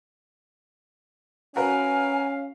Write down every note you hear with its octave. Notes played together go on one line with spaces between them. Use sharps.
C#4 F#4 A#4 B4 F5 G#5